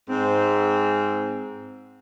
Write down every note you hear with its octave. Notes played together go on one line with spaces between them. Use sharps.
G#2 C4